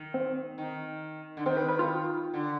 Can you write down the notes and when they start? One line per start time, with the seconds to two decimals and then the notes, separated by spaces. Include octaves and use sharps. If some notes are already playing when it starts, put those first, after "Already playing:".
Already playing: D#3
0.14 C4
0.58 D#3
1.37 D3
1.46 D#3 C4
1.57 B4
1.68 B4
1.79 F4
2.34 D3